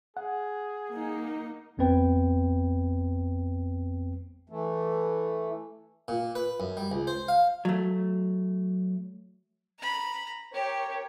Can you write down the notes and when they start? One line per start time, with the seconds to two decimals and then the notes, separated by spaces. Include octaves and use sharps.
0.17 G#4 F#5
0.91 A#3 D#4
1.77 G#1 F2 B3 C4 B4 G5
4.50 E3 A3
6.08 A#2
6.35 B4
6.60 F#2
6.77 G3
6.92 C#2
7.07 C5
7.28 F5
7.65 F#3 A3
9.79 A#5 B5
10.53 G4 A#4 C#5 G5